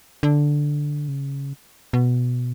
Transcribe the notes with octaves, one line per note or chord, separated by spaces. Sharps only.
D3
C#3
B2